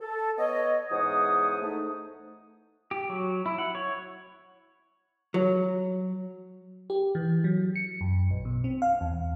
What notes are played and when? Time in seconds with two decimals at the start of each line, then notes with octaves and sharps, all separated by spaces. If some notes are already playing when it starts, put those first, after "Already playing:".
0.01 A4
0.38 B3 C#5 D#5
0.90 E2 G#2 C5 C#5 F#5 D#6
1.62 A3 D#4
2.91 G4
3.10 F#3
3.46 E4
3.58 F#5
3.75 C#5
5.34 F#3
6.90 G4
7.15 E3
7.44 F#3
7.76 C#7
8.01 F#2
8.31 A#1
8.45 B2
8.64 C4
8.82 F5
9.01 E2